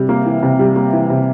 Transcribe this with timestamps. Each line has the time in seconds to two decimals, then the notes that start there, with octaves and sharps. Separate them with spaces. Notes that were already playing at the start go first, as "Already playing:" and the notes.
Already playing: C3 G3
0.09 A#3
0.26 E3
0.43 C3
0.59 G3
0.76 A#3
0.93 E3
1.10 C3